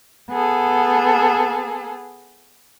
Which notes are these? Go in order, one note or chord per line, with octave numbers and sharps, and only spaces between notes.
B3 G#4 A4